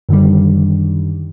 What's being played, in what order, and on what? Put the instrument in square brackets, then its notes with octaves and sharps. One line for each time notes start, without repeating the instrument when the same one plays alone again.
[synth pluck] F#2 D3 D#3 G3